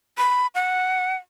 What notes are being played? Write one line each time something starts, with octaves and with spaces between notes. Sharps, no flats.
B5
F#5